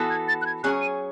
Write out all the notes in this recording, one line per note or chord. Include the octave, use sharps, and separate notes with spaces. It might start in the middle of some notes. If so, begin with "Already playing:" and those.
Already playing: E3 B3 F#4 A4
G#6
A6
F#6
G#6
F#3 C#4 G#4 F#6
D#7